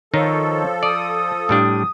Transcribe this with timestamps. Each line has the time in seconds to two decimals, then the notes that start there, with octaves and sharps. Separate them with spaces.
0.14 D#3 F3 D#4 A4 C#5
0.83 D5 D#6
1.49 A2 G3 D4